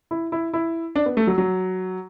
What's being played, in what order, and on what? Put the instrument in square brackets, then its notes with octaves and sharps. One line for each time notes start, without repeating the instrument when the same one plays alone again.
[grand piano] E4
E4
E4
D4
B3
A3
F#3
F#3